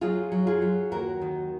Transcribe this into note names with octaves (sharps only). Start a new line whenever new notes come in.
F#3 F4 G#4
F#3
F4 G#4
F#3
D#2 F#4 A#4
D#3